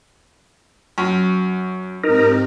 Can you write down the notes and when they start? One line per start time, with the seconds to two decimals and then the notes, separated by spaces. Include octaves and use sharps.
0.98 F#2
2.04 G#2 C4 D#4 G4 A#4